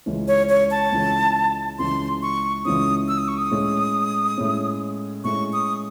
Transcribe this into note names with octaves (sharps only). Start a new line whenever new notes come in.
C#2 C#3 E3 G#3 C#4
C#5
C#5
A5
C#2 C#3 E3 G#3 C#4
C#2 C#3 E3 G#3 C#4 C6
C#6
C#2 C#3 E3 G#3 C#4 D#6
E6
D#6
C#6
D#6
A2 G#3 C#4
A2 G#3 C#4
A2 G#3 C#4 C#6
D#6